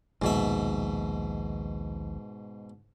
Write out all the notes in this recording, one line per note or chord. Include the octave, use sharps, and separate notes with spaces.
A#1 D#2 G#2 B2 E5